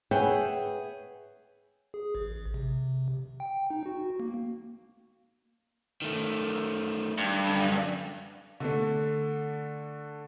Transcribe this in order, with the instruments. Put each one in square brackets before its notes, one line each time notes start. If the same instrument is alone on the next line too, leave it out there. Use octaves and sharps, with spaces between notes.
[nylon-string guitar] G#4 B4 C#5 E5 F#5 G5
[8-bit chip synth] G#4
A1
C3
G5
D#4
F#4
A#3
[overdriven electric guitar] D#3 A3
[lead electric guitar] G2
[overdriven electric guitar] F#2 D3
[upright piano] D3 A3